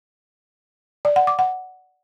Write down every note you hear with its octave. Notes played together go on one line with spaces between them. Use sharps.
D5
F#5
D6
F#5